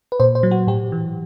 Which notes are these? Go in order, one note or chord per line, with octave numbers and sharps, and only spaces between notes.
B4
A#2 C5
C5
F#3
F#4
A2 G4
E3